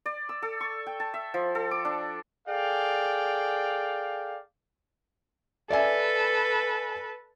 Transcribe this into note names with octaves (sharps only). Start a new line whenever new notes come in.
D5
E6
A4
C#6
G5
A5
E5
F3
A4
D6
D4
G#4 A4 D5 F5 G5
A4 B4 D5 E5 G#5